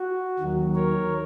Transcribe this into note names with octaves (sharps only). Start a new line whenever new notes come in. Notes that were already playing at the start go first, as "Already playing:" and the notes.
Already playing: F#4
D#2 D#3 F#3
A#4 C#5